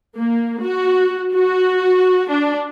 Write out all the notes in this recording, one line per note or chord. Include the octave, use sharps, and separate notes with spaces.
A#3
F#4
F#4
D4